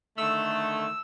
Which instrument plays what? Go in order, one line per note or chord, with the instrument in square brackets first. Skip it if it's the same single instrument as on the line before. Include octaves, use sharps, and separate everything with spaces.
[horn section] D3 D#3 A3 [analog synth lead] E6